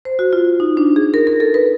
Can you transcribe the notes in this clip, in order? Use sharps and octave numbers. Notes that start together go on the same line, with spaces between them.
C5
F#4
F4
D#4
D4
G#4
A#4
A#4
A4
B4